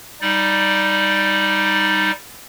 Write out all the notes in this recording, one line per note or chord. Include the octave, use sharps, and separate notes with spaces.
G3 D#4 D5